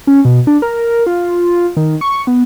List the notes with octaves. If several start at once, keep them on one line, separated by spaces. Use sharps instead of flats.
C#4
B2
D4
A#4
F4
D#3
C#6
B3